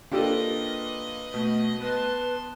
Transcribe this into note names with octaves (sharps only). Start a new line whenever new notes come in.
A#3 D4 F4 G4 A4 B4 D#5
B2 A3
B3 B4 A5 C6